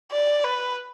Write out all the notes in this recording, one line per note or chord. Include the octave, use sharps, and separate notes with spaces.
D5
B4